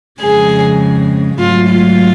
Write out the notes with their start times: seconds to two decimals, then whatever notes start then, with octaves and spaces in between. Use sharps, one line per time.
0.20 F2 C#3 G#3 G#4
1.39 G#2 F#3 A3 F4
1.69 F4